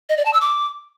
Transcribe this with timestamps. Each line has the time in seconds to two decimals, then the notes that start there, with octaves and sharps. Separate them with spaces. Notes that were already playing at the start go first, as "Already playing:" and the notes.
0.09 D#5
0.17 D5
0.25 A5
0.33 E6
0.41 D6